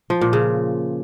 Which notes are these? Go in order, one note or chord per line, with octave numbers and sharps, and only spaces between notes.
F3
A#2
C#3